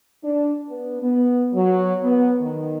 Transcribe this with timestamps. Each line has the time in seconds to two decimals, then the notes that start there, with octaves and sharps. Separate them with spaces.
0.22 D4
0.68 B3
1.01 B3
1.53 F#3
2.03 B3
2.40 D#3